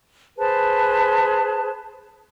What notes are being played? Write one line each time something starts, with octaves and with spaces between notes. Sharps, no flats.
G#4 B4 C5 A5